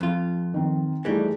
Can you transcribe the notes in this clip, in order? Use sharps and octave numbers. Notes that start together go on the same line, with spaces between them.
F2 F4
D#3 C4
E3 G3 A3 D#4 G#4